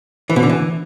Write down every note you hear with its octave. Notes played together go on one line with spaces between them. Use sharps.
E3
B2
D3
E3